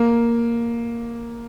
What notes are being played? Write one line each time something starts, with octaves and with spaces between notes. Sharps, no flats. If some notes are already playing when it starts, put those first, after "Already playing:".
Already playing: A#3